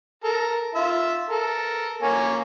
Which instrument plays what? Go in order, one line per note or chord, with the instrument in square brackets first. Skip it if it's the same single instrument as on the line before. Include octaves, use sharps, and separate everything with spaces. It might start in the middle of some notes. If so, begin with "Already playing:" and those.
[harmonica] A4 A#4
F4 E5
A4 A#4
A#3 C#5 G#5